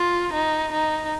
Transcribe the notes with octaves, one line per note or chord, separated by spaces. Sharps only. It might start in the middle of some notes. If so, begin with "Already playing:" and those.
Already playing: F4
D#4
D#4